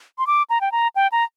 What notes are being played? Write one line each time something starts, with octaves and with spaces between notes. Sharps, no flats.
C6
D6
A#5
G5
A#5
G5
A#5